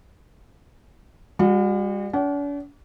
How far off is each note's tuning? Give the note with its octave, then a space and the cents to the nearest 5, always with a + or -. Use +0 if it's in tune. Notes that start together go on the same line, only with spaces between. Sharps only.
G3 +40 F#4 -25
D4 -45 F#5 +45